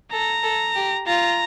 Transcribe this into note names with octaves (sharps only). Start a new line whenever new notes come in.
A4 A#5
A4
G4
F4 A#5